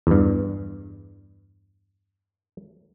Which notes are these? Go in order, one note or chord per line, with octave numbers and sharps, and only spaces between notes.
E2 G2